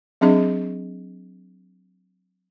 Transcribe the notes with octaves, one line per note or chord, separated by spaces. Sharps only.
F#3 C4 D4 G#4 D#5